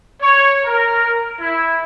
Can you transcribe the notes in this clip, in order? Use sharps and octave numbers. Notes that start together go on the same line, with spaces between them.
C#5
A#4
E4